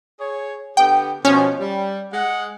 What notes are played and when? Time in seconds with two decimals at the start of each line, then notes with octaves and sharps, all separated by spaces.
0.20 G#4 C#5
0.77 D3 B3 G4 G5
1.25 B2 F3 C#4
1.59 G3
2.12 G#3 F#5